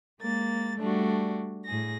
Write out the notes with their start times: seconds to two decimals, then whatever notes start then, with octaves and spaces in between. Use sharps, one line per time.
0.20 G#3 A#3 A6
0.79 G3 A3 D4 F#4
1.65 A2 G#4 A#6